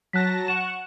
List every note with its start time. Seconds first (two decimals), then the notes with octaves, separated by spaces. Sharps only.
0.13 F#3 A5 F#6 A#6 B6
0.48 F#5 C#6 F#6 E7